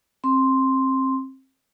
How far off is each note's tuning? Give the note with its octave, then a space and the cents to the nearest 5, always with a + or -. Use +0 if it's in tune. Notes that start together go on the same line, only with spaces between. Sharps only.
C4 +30 C6 +0